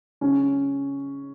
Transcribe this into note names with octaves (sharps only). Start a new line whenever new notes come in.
C#3 C#4